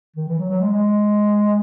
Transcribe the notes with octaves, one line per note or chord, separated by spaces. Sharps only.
D#3
E3
F#3
F#3
G#3
G#3